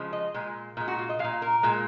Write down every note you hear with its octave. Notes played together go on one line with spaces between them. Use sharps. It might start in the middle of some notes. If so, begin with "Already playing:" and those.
Already playing: C#3 F3 G#3
D#5
A#2 G#3
A#2 G#3
F#4
F4
D#5
G#3 F5
A#2
A#4
A#2 G#3